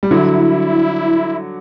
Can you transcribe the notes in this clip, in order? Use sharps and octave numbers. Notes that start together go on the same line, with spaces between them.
G3
D3 F#3 E4